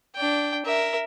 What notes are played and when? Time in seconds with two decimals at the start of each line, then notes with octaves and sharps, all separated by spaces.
0.15 D4 G5
0.66 A#4 E5